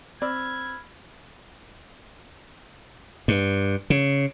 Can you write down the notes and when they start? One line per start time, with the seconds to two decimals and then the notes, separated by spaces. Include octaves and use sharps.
0.22 C4 D5 B5 E6 F6 G#6
3.28 G2
3.90 C#3